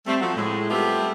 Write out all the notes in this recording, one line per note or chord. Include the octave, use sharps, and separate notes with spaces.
G3 A3 C4
F3 F#3 A3 C4 F#4
A2 G#3
G3 A3 B3 C4 F4 G4